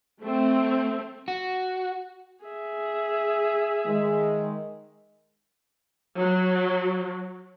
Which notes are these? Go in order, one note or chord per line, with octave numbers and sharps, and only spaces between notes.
A3 C4
F#4
G#4 E5
D#3 G#3
F#3